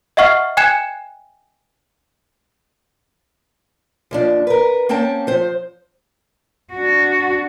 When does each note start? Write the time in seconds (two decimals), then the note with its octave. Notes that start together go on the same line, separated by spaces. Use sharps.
0.17 D#5 E5 F#5 C#6 F6 C7
0.57 G5 G#5 F#6 G#6 C#7 E7
4.11 D#2 F3 D4
4.47 A#4 B4
4.89 A#3 C4 C#4 G5 A5
5.27 F3 C5
6.72 D4 F#4